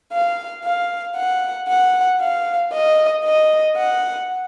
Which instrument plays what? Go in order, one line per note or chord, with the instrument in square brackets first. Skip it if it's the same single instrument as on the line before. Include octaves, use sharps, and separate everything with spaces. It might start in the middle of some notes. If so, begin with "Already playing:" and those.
[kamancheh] F5
F5
F#5
F#5
F5
D#5
D#5
F#5